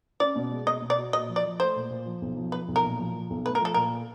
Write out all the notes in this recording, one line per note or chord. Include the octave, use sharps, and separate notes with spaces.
C#4 D5
B2
G#3
B2 D#5
B2
D5
F#4
A#2 D#5
F3
D5
F3
A3 C5
A#2
A#2
F3
B1
F3
F3 B4
B1
A#4
A#2
F3
F3
B1
A3 B4
A#4
F3 A4
A#2 A#4